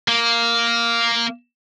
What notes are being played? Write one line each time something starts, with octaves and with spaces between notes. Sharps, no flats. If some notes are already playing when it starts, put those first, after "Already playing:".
A#3